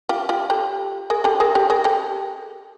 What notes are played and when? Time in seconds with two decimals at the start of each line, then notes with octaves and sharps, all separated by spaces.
0.09 F4 G4
0.29 F4 G4
0.50 G4 A4
1.10 G#4 A#4
1.24 G4 A4
1.40 G#4 A#4
1.55 G4 A4
1.70 G#4 A#4
1.84 G4 A4